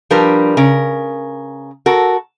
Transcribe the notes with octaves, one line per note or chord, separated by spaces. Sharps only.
F3 G3 D4 A#4 B4
C#3 A#4
F#4 A4 A#4